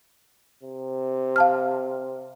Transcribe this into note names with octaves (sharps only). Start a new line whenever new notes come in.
C3
F5 A5 F6